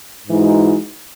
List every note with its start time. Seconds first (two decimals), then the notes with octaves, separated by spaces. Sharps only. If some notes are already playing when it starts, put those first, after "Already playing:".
0.28 G#2 E3 G#3 D#4 F#4